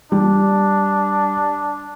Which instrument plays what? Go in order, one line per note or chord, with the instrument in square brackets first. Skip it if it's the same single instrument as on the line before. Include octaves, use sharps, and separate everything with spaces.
[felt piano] G3 [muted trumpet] D4